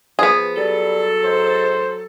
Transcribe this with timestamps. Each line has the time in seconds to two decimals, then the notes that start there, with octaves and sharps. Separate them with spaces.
0.19 F3 B3 G#4
0.57 F#3 G3 A4
1.24 G#2 C5